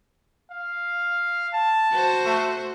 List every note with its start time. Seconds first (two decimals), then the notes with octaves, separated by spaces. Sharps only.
0.51 F5
1.54 A5
1.92 F#4 C5
2.25 A3